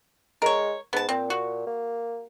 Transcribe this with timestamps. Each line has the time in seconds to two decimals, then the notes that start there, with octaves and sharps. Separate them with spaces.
0.42 G#3 A#4 C#5
0.93 G#2 B3 A5
1.09 A#2 C4
1.30 F#4
1.67 A#3